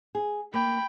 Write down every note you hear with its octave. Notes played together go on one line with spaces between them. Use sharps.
G#4
A#3 G5 B5